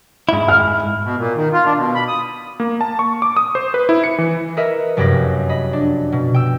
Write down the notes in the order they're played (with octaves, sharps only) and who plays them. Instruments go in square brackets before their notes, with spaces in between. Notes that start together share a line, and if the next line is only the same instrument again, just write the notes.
[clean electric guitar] G#2 E4
[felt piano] F6
[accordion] B2
A#2
D#3
F4
D4
B2
B5
D#6
[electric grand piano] A#3
A5
C#6
D6
D#6
C5
B4
E4
C#7
E3
[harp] A#4 B4 D#5 E5
F1 F#2 G4 B5 A#6
D#5 B5
D4
B2
G5 E6